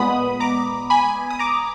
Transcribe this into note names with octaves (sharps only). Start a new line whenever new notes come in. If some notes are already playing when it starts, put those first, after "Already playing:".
Already playing: A#2 G#3 B3 B5 D#6
A#5 D6
G#5 B5
D#6
A#5 D6